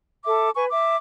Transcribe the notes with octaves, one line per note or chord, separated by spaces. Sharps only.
A4 E5 D6
B4 G#5 C#6
E5 D6